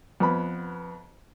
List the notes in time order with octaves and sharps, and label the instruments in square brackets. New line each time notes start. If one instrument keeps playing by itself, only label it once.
[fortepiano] F2 B3 B5